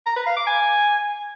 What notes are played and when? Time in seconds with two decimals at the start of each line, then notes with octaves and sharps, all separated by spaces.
0.06 A#5
0.16 B4
0.26 F5
0.37 D6
0.47 G#5